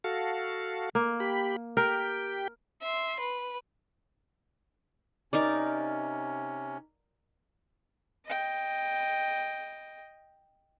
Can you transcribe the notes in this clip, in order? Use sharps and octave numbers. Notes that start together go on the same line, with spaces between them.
F#4 A4 F5
A#3
G4 B5
G4 A#4 G5
E5 C6
B4
C3 C#4 D#4 A#4 D5
D#5 G5